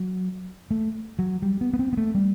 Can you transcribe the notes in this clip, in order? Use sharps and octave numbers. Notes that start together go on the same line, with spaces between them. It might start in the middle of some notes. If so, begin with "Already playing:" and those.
Already playing: F#3
A3
F#3
G3
B3
B3
C4
B3
A3
G3